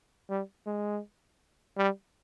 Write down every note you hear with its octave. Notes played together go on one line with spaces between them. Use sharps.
G3
G#3
G3